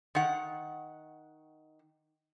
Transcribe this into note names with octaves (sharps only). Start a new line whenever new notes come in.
D#3 F#5